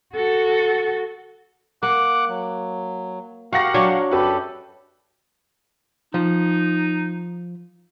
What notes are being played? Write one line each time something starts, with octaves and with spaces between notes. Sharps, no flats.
F#4 A4
A#3 F#5 D6 F#6
F#3
F#4 G4 A#4 F5 F#5 A#6
F#3 D4 C#5
F#2 F#4 G4 A4 B4
F3 D#4